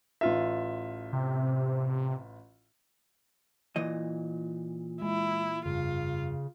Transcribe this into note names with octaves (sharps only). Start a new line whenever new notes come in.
A1 F4 E5
C3
A#2 E3 D#5
G#3 E4
F1 G2 C#3 F4